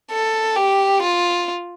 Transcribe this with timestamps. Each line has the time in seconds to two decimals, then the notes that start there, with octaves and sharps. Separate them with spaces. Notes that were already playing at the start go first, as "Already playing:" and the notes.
0.11 A4
0.56 G4
1.03 F4